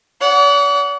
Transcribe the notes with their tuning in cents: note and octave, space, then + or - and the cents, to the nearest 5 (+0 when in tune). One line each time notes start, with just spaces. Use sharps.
D5 -45 F#5 +0